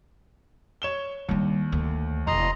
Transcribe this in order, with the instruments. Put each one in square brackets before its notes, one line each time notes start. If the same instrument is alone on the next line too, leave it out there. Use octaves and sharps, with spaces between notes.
[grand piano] C#5 E7 G7
[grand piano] D#2 [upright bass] G3 D4
[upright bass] D2
[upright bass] E1 [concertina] D#5 A#5 C6